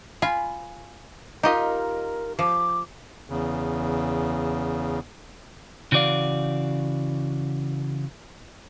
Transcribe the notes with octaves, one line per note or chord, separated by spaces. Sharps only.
F4 G#5 B5
D#4 F4 G4 A#4 D#5
F3 D6
E2 C#3
C#3 E3 F#4 D5 F5